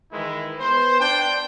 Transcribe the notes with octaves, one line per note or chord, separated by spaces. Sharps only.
D#3 E3 G#3 E4
B3 B4 C5
D4 G5